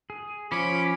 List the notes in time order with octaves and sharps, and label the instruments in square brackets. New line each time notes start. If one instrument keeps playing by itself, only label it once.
[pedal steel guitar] G#4
[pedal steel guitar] F3 [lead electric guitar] C#4 [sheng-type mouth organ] B5 D6